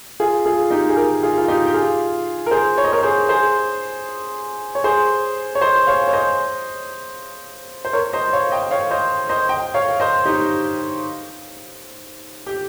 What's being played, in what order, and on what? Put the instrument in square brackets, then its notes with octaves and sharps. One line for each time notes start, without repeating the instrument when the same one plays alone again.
[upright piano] F4 G#4
F4 G#4
D#4 G4
G#4
G4 A#4
F4 G#4
F4
D#4 G4
G4
F4 G#4
A#4
G#4 C5
C#5
D#5
A#4 C#5
G#4 C5
G#4 C5
C#5
G#4 C5
C#5
C5 D#5
C#5 F5
C#5
C5 D#5
C5
A#4 C#5
C5 D#5
C#5 F5
D#5 G5
C#5 F5
C5 D#5
C5 D#5
D#5 G5
C#5 F5
C5 D#5
D#4 G4
G4